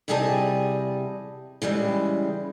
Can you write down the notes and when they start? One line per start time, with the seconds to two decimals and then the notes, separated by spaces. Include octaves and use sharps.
0.08 E2 C3 G3 G#4 D#5 A5
1.62 C#3 E3 G3 G#3